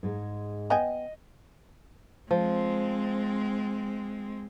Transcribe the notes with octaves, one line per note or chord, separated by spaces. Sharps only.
G#2 G#3
B3 D#5 G5 G#5
F3 G#3 C4